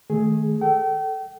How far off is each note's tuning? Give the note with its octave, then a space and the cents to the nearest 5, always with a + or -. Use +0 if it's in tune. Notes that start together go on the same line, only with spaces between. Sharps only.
D#3 +0 A3 -20 G#4 +0
A4 +0 G5 -35